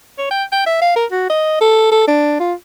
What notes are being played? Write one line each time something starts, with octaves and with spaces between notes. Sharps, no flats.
C#5
G5
G5
E5
F5
A#4
F#4
D#5
A4
A4
D4
F4